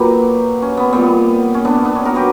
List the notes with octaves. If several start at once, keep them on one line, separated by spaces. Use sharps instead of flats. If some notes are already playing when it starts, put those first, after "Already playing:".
Already playing: A#2 F#3 G4 B4
C#4
B3
A#2 G3 B3
C#4
B3 D4
B3 D4
C#4
F#4 A#4
F#3 G4 B4